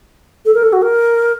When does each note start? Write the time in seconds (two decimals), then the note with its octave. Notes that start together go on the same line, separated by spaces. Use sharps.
0.45 A4
0.55 A#4
0.63 A4
0.73 F#4
0.82 A#4